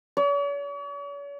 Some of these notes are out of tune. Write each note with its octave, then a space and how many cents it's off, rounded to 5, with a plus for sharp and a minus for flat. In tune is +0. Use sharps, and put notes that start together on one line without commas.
C#5 +45